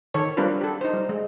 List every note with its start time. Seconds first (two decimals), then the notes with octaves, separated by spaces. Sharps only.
0.14 D#3 A4 C#5
0.37 G3 C4 D4 F4 A#4 B4
0.61 G4 A4
0.81 D#4 C5
0.94 G3
1.09 G#3